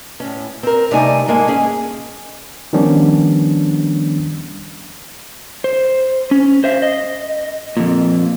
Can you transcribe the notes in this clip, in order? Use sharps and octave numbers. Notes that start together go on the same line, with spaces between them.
A2 C#4
C4 A#4
C3 G3 A3 D#4 G#5
G#2 G#3 A#3 A4 G#5
C#4 G#4
D#3 F3 G3 B3 C#4 D4
C5
C#4
C5 E5 F5
D#5
F2 A#2